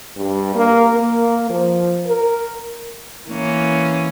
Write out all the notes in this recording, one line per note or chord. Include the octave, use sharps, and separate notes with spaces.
G2
A#3
A#3
F3
A#4
E3 A#3 C#4